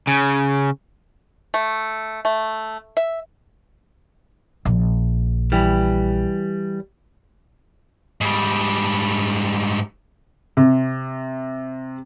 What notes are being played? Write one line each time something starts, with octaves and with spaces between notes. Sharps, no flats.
C#3
A3
A3
E5
A#1
E3 G3
G#2 G3
C3